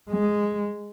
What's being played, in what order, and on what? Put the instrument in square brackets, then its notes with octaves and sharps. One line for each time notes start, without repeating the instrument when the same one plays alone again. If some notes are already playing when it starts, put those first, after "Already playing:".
[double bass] G#3